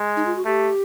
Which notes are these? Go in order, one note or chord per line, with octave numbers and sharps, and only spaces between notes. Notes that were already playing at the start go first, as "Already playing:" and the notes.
Already playing: G#3
D#4
F4
F#4
A3 G4